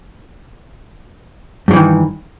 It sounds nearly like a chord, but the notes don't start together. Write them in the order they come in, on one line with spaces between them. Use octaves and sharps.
G2 F#3 E3 D#3